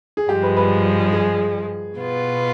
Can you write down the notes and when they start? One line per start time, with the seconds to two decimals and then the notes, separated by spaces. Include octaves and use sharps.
0.17 G#4
0.29 G2 F3 G#3 G4
0.43 B4
0.57 B4
1.13 G#4
1.97 B2 B3 F4